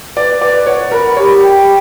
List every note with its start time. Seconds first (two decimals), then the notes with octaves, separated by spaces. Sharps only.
0.16 B4 D5
0.41 B4 D5
0.66 C#5 F#5
0.92 A#4 B5
1.17 G4 C#5
1.42 G5